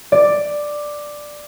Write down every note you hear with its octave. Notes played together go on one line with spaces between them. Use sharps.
D5